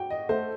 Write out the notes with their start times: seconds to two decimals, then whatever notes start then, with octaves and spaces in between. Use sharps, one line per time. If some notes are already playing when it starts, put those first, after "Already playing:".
Already playing: F#4 G5
0.10 D#5
0.29 A3 C5